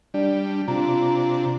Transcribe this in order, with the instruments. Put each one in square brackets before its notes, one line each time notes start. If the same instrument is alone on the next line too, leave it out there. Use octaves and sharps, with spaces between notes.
[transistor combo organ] G3 [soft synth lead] D4
[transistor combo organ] C3 D4 [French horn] F4 [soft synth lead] A#5